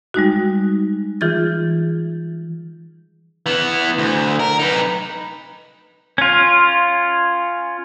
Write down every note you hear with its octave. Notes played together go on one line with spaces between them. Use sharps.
G3 G#3 D#4 F#4
E3 F4 G#4 G6 A6
E3 B3
D2
A#4
D#4 B4
C#4 F4